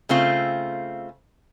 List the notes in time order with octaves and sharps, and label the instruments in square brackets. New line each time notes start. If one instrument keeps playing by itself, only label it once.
[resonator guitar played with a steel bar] C#3 A3 C4 F4